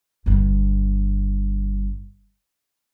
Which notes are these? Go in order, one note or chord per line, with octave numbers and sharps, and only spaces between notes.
G1 G2